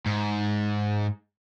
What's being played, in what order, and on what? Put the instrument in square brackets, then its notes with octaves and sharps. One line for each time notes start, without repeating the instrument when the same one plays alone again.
[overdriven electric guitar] G#2